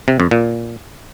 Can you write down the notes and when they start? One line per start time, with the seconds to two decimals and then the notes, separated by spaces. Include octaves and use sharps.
0.08 C3
0.20 F2
0.31 A#2